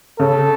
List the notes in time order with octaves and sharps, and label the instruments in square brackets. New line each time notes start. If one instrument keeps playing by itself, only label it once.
[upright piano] C#3 [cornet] A4